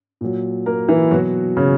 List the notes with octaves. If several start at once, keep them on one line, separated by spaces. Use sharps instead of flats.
A#2 F#3
A#3 A#4
E3 E4
B2 F#3 F#4
C#3 C#4